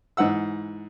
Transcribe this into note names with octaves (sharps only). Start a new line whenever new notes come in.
G#2 E3 F#5 E6